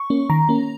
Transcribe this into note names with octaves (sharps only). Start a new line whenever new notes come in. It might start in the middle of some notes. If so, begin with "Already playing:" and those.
Already playing: C#6
A#3 C#4
D#3 A#5
A#3 C#4